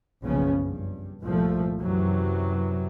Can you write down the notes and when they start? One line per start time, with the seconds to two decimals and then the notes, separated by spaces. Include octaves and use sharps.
0.25 F#1 B1 C#3 F3 B3 C#4
0.61 G2
1.23 C2 A#2 F3 A3
1.80 F#2 C3 E3 F#3